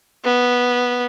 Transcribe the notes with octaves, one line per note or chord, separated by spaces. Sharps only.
B3